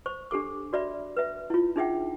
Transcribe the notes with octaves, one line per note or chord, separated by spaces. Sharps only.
C5 C#6
D4 G4 A4 D6
F#4 D5 E5 B5
B4 E5
E4 F4
D4 D#4 G#4 E5 F#5 G5